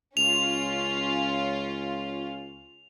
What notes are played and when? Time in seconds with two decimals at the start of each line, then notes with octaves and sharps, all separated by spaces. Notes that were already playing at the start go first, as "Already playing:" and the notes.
0.17 C#2 C#4 F4 F7